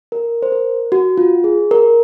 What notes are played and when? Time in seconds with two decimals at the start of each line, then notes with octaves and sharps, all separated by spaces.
0.12 A#4
0.42 C5
0.52 A#4
0.92 F#4
1.18 F4
1.44 G#4
1.71 A#4